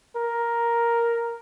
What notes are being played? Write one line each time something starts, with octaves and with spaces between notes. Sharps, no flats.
A#4